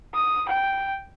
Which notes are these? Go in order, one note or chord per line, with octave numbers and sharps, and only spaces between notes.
D#6
G5